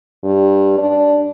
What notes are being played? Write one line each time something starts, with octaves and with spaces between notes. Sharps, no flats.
G2
D4